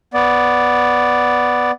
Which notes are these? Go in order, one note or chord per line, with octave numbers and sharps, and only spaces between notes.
B3 D5